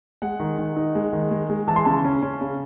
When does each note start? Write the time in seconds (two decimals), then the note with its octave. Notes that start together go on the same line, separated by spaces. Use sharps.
0.22 G#3 F#5
0.40 D#3
0.59 D#3
0.76 D#4
0.95 G#3
1.13 D#3
1.31 G#3
1.49 G#3
1.68 E3 A5
1.76 C6
1.85 C#3 A5
2.04 C#4
2.22 C#4
2.41 C#3